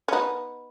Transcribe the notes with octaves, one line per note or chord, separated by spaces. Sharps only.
C#4
B3 D#4